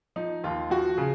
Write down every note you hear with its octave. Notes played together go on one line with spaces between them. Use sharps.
F3 D#4
D#2 F4
F3 F#4
C#3 G#4